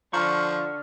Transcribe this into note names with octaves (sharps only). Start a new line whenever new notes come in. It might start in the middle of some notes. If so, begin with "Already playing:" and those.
D3 F3 A#5 C#6 F6